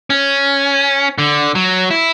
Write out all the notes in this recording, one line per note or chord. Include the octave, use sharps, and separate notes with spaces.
C#4
D3
F#3
E4